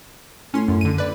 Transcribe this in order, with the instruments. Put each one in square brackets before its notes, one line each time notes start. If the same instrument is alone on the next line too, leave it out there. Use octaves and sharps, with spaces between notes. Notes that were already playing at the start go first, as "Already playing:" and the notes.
[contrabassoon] A2 [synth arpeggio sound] C#4 C6
[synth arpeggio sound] F#2
D3 D#7
B4 D5